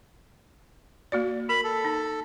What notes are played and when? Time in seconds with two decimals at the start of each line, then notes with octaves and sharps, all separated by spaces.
1.12 A#3 F#4 D5
1.49 A#4 B5
1.64 A4
1.85 D#4